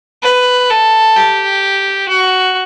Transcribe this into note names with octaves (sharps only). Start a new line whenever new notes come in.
B4
A4
G4
F#4